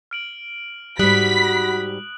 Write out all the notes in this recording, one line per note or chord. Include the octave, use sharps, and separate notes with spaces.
F6 D7 F#7
G#2 G3 F#4 B5 D#6 F#6 B6 F#7